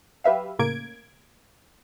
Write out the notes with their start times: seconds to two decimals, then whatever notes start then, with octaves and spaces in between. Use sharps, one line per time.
0.24 F#3 G4 B4 E5 F5
0.59 A2 C#3 A#3 G#6 D7